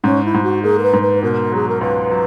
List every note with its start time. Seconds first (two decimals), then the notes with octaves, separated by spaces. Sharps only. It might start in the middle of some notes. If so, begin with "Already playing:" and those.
0.04 G#2 C#4
0.24 E4
0.34 G#2
0.44 F#4
0.63 A#3 G#4
0.79 A#4
0.83 B4
0.93 G#2
1.02 B4
1.23 B2 A#4
1.52 F#3 G#4
1.68 A#4
1.81 C#2 B4
2.11 F#3